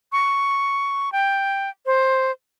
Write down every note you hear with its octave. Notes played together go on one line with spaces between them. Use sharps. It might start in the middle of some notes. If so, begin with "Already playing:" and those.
C#6
G5
C5